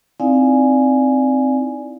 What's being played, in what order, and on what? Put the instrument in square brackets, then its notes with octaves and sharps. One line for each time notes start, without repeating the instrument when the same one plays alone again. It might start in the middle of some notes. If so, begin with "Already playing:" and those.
[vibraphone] C4 D#4 E4 D5 F5 G#5